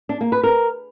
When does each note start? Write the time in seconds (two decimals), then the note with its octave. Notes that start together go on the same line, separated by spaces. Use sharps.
0.09 D4
0.21 A#3
0.32 B4
0.43 A#4